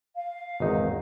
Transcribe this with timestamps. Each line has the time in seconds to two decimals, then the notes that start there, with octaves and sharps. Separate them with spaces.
0.16 F5
0.60 G#1 E2 D#4